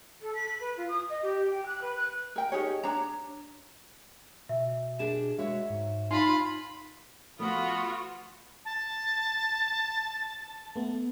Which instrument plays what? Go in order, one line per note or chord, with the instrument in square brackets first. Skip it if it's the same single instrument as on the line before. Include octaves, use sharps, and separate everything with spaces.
[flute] A4
B6
B4
F4
D#6
D#5
G4
G5
F#6
B4
F#6
[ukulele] A#4 G5
D#4 G4 G#4 C#5
D4 C#5 A#5
[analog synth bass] B2 [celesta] E5
[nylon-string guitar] D4 G4 G#4 [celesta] E7
[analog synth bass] G#3 [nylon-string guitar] F#4 C#5 E5
[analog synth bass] G#2
[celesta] D#4 C6 C7 [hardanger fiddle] F4 B5
[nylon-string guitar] F3 A3 B3 [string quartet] F4 F#4 [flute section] B5 D#6
[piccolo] A5
[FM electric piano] A3 B3